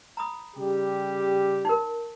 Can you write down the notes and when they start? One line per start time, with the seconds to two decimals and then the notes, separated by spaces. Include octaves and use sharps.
0.17 A#5 B5 D#6
0.56 C#3 G3 G4
1.65 D#4 A#4